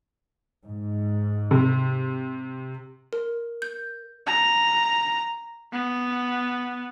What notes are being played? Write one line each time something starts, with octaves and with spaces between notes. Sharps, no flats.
G#2
C3
A#4
G6
A#5
B3